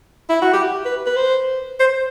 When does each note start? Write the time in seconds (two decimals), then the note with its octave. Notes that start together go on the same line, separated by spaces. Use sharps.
0.29 E4
0.42 F#4
0.53 G4
0.85 B4
1.06 B4
1.16 C5
1.80 C5